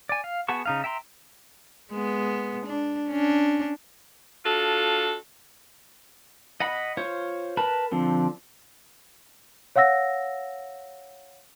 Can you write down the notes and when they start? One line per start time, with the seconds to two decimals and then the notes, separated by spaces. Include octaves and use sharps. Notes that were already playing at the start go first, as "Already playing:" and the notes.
0.09 D5 G#5
0.24 F5
0.49 B3 F#4 G#4 A5 C#6
0.66 C#3 D#4 F5
0.84 E5 G5 A#5 C6
1.92 G#3 B3
2.65 D4
3.10 C#4 D4
4.44 D4 F4 F#4 A4
6.60 D#5 F#5 B5
6.97 F4 C5 C#5
7.57 A#4 B4 A5 B5
7.92 D3 F3 C4
9.76 C#5 F5 F#5 E6 A#6